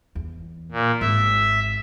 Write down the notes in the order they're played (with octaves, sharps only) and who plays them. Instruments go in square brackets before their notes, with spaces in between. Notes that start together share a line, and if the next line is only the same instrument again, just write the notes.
[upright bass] E2
[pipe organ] A#2
[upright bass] G#1 [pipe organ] E5